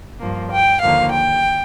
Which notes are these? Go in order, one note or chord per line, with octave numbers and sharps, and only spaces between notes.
G2 F3 A#3
G5
D#2 D3 F3 A#3 F5
G5